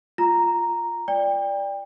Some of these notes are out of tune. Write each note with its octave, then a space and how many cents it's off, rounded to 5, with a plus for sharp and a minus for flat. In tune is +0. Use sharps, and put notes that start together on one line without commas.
F4 +0 A#5 +0
D5 +0 G5 +25